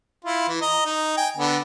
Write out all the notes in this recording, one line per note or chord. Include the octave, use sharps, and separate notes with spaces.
E4 F4
E3
D#5 A#5
D#4
G5 G#5
D3 B3